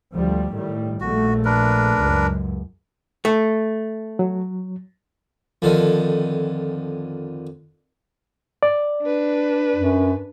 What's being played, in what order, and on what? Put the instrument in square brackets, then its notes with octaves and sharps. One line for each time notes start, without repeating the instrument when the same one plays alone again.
[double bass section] D2 F3 G3
A2 D#3 G3
[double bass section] A#1 A3 [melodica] F#4
[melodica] D4 A#4 B4
[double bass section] C#2 F#2
[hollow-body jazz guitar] A3
[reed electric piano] F#3
[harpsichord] F2 D3 D#3
[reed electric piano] D5
[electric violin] D4 B4
[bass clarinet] F#2